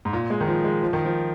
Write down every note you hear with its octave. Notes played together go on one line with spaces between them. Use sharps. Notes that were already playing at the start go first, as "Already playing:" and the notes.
G#2
A#2
G#3
D#3
F3
G#3
F3
D#3
F3